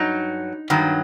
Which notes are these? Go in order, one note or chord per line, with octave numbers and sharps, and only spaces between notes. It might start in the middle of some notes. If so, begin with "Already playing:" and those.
Already playing: G2 F#3 D#4
G2 D#3 F#3